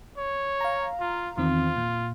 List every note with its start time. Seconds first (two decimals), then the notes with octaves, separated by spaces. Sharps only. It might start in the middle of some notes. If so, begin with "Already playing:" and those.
0.18 C#5
0.61 F5 A#5
1.00 F4
1.37 E2 D#3 C4 F4
1.76 A#2